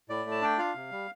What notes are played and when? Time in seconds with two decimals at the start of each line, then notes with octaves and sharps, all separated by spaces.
0.09 A2 D5
0.26 A3
0.31 A5
0.41 D4 G5
0.58 F4 F5
0.75 C3
0.91 G3